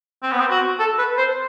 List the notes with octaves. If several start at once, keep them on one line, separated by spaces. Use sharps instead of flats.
C4
B3
C4
F#4
A4
B4
C5